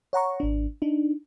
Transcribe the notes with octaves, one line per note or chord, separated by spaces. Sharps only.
C#5 F#5 A#5 C#6
G#1 D4
D4 D#4